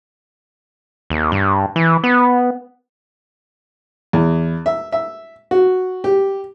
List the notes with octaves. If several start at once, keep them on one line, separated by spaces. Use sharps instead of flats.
D#2
G2
E3
B3
E2
E5
E5
F#4
G4